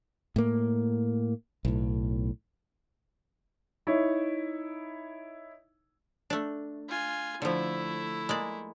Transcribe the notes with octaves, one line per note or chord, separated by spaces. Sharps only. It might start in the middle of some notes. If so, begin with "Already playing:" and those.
A2 A#3
B1 A2
D#4 E4 C#5
A3 D4
F4 G#5
D3 F3 A3 E4
G#3 A#3 D5